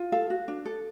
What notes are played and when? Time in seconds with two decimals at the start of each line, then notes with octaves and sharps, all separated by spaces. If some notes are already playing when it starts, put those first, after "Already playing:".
Already playing: F4
0.12 A4 F5
0.30 F#4
0.48 D4
0.66 A4